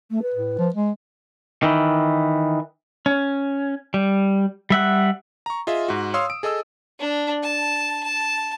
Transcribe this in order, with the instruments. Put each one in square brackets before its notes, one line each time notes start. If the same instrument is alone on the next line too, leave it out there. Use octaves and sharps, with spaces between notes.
[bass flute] A3
B4
[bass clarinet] A2
F3
G#3
[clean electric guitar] D#3 E3
[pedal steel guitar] C#4
G3
G3 E5 F#5
[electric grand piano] A#5 C#6
F4 G#4 D#5 E5
G#2 F#4
C#5 F5 C6 D#6 E6
D7
G#4 A4 D#5 D#6 E6
[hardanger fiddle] D4
A5
A5